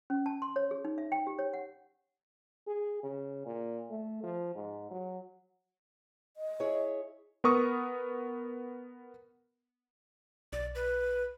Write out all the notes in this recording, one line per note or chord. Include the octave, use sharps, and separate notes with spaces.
C#4
A5
C6
C#5
G#4
D#4
E5
G5
G4
C#5
F#5
G#4
C#3
A#2
A3
F3
G#2
F#3
D#5
E4 G#4 C#5
B3 A#4 C#6 D#6
B1 D5
B4